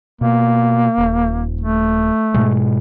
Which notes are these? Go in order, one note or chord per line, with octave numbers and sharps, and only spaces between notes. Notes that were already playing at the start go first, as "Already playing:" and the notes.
B2 A#3
D#1
A3
G#2 B2 G#3